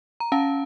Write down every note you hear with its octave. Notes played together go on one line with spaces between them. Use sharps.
A#5
C#4 F5 A5